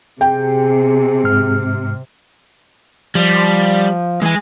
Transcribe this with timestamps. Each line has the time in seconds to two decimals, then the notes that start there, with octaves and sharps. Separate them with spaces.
0.21 C3 G#4 G5
1.24 G#2 F6
3.15 F3 G3
4.22 E3 G#3 G#5